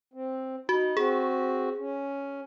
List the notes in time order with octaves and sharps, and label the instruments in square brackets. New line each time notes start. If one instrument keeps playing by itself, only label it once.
[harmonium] C4
[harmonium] D#4 [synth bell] F#4
[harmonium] C4 F#4 [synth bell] G#4
[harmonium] C#4